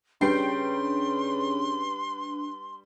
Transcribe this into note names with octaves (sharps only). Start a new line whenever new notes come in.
C#3 G3 D4 B4 G5 C6 C7